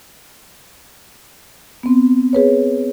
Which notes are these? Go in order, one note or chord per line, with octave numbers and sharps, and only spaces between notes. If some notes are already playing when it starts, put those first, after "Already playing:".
B3 C4
G#4 B4 C#5